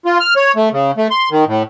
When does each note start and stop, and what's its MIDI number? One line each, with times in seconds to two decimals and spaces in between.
0.05 0.18 65
0.20 0.34 89
0.36 0.52 73
0.56 0.69 57
0.72 0.91 49
0.97 1.08 57
1.11 1.29 84
1.31 1.45 51
1.47 1.63 45